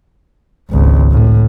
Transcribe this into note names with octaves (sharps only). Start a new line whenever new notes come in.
G#1 C#2
A2